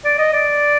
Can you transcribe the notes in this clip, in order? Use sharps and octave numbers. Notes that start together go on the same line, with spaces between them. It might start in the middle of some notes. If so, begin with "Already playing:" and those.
D5
D#5
D5